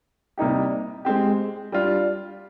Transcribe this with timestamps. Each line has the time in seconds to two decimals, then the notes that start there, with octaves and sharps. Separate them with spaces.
0.37 C3 G3 A#3 D#4 G4
1.05 G#3 C4 G4
1.72 G3 D4 F4